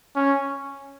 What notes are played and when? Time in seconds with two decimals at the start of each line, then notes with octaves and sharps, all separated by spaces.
0.16 C#4